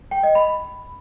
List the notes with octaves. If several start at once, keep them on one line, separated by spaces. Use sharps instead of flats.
G5
D#5
B5